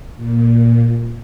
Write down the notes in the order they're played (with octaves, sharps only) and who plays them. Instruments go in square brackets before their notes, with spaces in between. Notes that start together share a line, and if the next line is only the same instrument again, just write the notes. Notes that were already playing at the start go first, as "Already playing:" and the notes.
[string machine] A#2